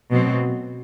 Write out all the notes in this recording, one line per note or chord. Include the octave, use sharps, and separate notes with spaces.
B2 F#3 A3 C4